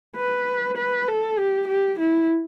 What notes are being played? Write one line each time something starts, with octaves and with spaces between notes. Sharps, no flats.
B4
B4
A4
G4
G4
E4